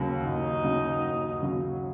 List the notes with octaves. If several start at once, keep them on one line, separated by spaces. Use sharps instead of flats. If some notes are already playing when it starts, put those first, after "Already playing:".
Already playing: D#2 C#3 F#3
D#2 D#4
C#3 F#3
D#2
C#3 F#3